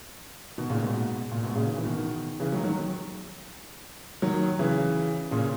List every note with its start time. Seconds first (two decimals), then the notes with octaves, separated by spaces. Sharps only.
0.58 B2 D#3
0.70 A#2 C#3
0.82 G#2 B2
1.31 A#2
1.43 G#2 B2
1.55 A#2 C#3
1.67 D#3
1.77 E3
1.85 B2 D#3
2.40 C#3 E3
2.52 D#3 F#3
2.64 D#3 F#3
4.22 D#3 F#3
4.59 C#3 E3
5.31 A#2 C#3